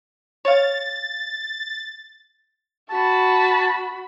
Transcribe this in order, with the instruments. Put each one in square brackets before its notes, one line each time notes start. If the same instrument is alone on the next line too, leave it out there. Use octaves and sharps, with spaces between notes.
[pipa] C#5 F5 [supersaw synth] A6
[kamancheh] F#4 B5 [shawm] A5